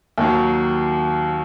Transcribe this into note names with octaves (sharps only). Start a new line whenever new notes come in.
D#2 D#3 F#3